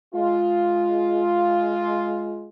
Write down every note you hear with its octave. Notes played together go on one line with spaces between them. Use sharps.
G#3 F4